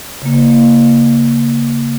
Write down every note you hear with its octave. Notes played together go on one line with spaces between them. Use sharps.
C#3 A#3